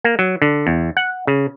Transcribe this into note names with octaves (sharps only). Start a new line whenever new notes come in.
A#3
F#3
D3
E2
F#5
C#3